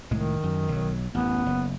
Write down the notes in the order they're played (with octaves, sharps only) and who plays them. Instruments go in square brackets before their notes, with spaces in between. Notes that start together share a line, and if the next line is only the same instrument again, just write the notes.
[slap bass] C2 A2 G#3 [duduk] D#3
[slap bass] F#2
B1 F#3
[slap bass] A1 F#2 [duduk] B3
[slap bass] F#1